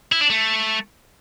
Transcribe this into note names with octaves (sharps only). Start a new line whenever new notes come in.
E4
D4
A3